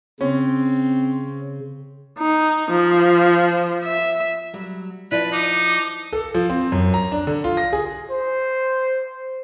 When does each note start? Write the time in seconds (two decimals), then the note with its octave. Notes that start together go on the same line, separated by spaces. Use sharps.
0.21 C#3 C4 C#4
2.19 D#4
2.71 F3
3.84 E5
4.53 F#3 G3
5.12 F3 E4 B4 D5
5.32 D#4 D6
6.13 A4
6.34 F3
6.50 C4
6.72 F#2
6.94 A#5
7.12 D4
7.27 D3
7.44 F4
7.57 A#6
7.73 G#4
8.11 C5